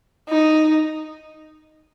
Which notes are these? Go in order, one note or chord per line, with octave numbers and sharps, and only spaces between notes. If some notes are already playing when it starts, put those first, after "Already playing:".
D#4